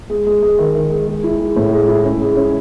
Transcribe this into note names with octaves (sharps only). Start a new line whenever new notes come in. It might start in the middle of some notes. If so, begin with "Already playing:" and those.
G#3
G#3
G#3
D#3
D#3
G#3
G#3
E4
G#3
A2
G#3
E4
C#4
G#3
C#4